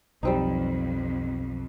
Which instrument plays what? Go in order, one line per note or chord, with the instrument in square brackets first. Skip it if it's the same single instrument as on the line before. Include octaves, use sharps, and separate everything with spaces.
[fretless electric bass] B1 [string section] F2 [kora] G3 C4 D#4